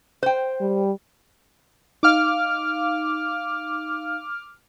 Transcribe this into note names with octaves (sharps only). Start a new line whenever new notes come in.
C5 G5
G3
D#4 F5 D6 F6